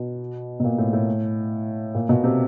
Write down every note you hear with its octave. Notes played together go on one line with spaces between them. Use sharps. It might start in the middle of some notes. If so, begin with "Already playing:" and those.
Already playing: B2
B2
A#2
A2
A2
A#2
B2
C3